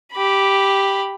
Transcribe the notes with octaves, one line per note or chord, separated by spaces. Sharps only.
G4 B5